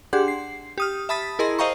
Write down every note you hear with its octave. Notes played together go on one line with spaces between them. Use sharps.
D4 G4 G#4 F#5 C6
C7
G4 D#6 F6
E5 A5 B5 D#6 A6 B6
E4 G#4 A#4 D#5 A#5 C6
C5 D#5 F5 G5 A#5 C#6